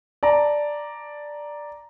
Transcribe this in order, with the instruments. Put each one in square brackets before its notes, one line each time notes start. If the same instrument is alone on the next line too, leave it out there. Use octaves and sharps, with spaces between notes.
[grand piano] D5 A5 A#5